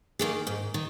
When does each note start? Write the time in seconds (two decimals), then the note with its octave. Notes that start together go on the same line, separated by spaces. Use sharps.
0.19 D#3 A#3 G#4
0.47 G#2
0.74 D#3